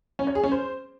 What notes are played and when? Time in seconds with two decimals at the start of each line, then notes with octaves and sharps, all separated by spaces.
0.19 C#4
0.27 C#5
0.35 G#4
0.43 C#4
0.52 C5